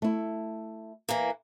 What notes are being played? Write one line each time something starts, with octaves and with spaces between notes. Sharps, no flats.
A3 E4
E3 A#3